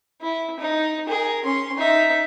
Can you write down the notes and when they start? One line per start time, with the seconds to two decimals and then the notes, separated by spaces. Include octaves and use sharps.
0.22 E4
0.59 D#4
1.08 G#4 A#4
1.45 C#4 C6
1.77 D#4 E5